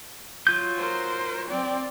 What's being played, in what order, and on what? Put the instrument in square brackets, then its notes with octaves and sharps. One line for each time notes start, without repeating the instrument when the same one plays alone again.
[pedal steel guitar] F#3 F4 G6
[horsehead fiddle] A#4 C5
C4 D5